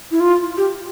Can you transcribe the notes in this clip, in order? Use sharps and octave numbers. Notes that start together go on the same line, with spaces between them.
E4
F4
G4